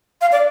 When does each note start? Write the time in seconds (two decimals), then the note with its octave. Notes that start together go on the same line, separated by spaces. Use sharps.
0.21 F5
0.32 D5